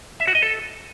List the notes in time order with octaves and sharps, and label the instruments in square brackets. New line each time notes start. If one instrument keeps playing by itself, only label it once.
[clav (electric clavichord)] E5
F#4
D#5
A4